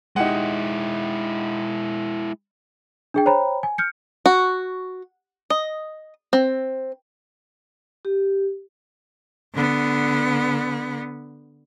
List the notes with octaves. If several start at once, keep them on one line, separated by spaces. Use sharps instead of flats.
G#3 D#4 E4 G4 F#5
D4 G#4 G5
C5 C#5 G5 A#5 B5
G#5
F6 G6 C#7
F#4
D#5
C4
G4
D3 B3